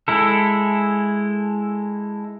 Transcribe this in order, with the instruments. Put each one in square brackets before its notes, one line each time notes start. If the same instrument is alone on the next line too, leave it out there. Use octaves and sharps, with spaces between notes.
[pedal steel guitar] G#3 E4 A4